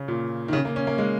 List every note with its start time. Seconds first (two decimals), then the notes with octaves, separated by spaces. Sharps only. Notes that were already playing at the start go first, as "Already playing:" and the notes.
Already playing: C#3
0.08 A#2
0.48 D#3
0.53 C#3
0.65 A#3
0.76 C#4
0.87 A#3
0.98 G#3